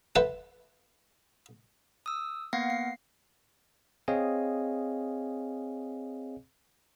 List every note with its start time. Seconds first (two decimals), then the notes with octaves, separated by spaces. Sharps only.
0.16 A4 B4 C5 E5 F#5 A5
2.06 D#6 E6
2.53 A#3 B3 F5 F#5 A#6 C7
2.70 C7
4.08 C4 G#4 C#5 D#5 F5 G#5